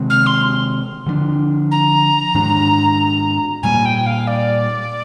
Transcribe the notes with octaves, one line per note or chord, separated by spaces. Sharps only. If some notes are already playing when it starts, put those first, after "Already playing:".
Already playing: C3 D#3 G#3 C4
F6
C6
D3 F3 G#3 D4
A#5
G#2 D#3 G#3 D4
A#2 G3 A#3 G#5
G5
F5
D5